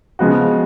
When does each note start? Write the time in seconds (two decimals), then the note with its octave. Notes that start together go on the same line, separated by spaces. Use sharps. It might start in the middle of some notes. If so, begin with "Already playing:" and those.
0.19 C#3 F3 G#3 B3 F#4